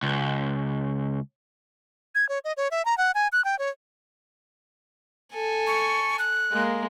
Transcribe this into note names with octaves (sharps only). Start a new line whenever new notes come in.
C#2
G#6
C#5
D#5
C#5
E5
A#5
F#5
G#5
F#6
G5
C#5
A4 G#5
C#6
F#6
G#3 A#3